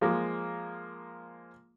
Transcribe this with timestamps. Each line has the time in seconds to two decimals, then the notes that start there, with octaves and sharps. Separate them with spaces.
0.01 F3 G#3 A#3